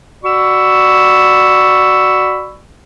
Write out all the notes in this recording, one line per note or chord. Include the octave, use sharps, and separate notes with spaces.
F#4 D5 B5 C#6 E6